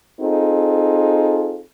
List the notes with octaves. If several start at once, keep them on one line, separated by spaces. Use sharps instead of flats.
C4 D#4 F4 G#4 A4